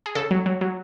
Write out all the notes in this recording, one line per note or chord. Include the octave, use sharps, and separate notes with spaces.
G#4
C#3 A4
F#3
F#3
F#3